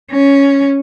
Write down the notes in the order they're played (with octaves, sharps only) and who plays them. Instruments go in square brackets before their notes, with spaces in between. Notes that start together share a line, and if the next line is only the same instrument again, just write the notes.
[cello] C#4